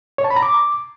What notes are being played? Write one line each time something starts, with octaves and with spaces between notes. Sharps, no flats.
C#5
A5
B5
A#5
D6